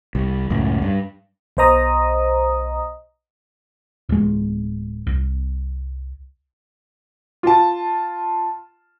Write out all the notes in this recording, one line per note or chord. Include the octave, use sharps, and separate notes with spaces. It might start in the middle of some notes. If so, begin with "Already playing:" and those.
C2
C#2 F#2 A2
G2
B1 B2 C5 D#5 A#5 D#6
D1 G#3
C2
F4 A5